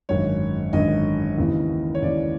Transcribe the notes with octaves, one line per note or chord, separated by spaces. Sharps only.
G#1 F#2 D3 C#5
G#1 F#2 D3 D#5
D#2 C#3 E3
C#5
D#2 C#3 E3 D5